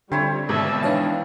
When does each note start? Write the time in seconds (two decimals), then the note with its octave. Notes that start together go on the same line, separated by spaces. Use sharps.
0.12 D3 G3 C4 E4 C#5
0.49 G#1 G#2 B2 E5 A5
0.83 E3 D4 C#5 F5